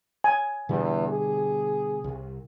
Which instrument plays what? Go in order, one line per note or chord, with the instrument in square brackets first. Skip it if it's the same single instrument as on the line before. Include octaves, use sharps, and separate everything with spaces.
[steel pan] G#5
[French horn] E2 [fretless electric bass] B2 D3 G3
[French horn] G#4
[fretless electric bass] C2